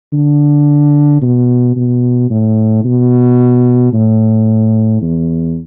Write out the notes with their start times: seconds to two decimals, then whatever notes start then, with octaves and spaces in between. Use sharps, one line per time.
0.13 D3
1.22 B2
1.76 B2
2.30 A2
2.84 B2
3.93 A2
5.01 E2